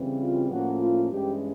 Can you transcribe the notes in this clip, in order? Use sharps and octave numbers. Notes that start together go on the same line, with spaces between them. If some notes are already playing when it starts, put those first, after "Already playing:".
Already playing: C#3 E3 G3 C4
F4
A2 F3 A#3 C#4 F#4
F4
G2 E3 G#3 C#4 G4